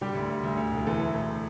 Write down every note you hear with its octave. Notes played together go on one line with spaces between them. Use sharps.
D3 G3 G4
D2
D2
D2
D2
E1
E3 A3 A4
D2
E1